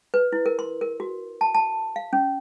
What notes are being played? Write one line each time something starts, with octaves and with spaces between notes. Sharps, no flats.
B4
E4
A#4
C6
A#4
F#4
A5
A5
F5
C#4